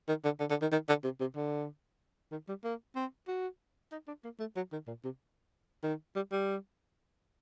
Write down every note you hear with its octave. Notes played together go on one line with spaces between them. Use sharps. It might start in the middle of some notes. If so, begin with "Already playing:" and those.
D#3
D3
D3
D3
D#3
D#3
D3
C3
C3
D3
D#3
G3
A#3
C4
F#4
D#4
D4
A#3
A3
F#3
D#3
A#2
C3
D#3
G3
G3